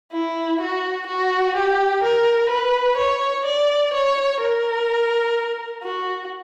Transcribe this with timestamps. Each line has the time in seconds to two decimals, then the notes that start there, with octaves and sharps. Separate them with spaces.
0.12 E4
0.61 F#4
1.07 F#4
1.56 G4
2.03 A#4
2.50 B4
2.97 C#5
3.45 D5
3.93 C#5
4.41 A#4
5.83 F#4